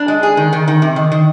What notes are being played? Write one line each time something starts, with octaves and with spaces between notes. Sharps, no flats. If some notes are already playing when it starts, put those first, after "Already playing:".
Already playing: D4
G#3
G#4
D#3
D#3
D#3
C3
D#3
D#3